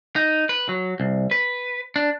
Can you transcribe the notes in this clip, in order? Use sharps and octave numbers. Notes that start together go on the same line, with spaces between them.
D#4
B4
F#3
C2
B4
D4